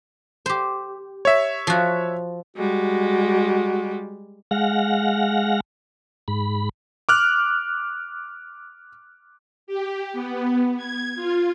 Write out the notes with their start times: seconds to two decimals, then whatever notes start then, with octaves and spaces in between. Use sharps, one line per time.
0.46 G4 C5
1.25 C#5 E5
1.67 F3 F#4
2.57 G3 G#3 F#4
4.51 G#3 F5 F#5 A#6
6.28 G#2 B5
7.09 D6 F6 F#6
9.67 G4
10.13 B3
10.77 G#6
11.16 F4